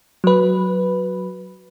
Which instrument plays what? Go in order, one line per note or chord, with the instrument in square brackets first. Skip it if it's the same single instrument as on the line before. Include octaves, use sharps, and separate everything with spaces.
[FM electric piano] F#3 B4